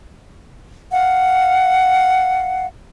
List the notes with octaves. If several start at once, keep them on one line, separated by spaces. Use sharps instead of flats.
F5 F#5